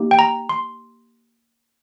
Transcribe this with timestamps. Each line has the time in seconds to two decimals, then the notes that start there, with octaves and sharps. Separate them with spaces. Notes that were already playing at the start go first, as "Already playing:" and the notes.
Already playing: A#3 D#4 G4
0.11 G5
0.19 A#5
0.49 C6